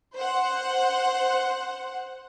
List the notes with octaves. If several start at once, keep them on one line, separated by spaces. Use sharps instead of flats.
C5 F#5